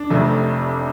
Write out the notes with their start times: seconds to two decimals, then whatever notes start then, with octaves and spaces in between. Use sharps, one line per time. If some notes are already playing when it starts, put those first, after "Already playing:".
Already playing: D4
0.10 F1 F2 C3 A3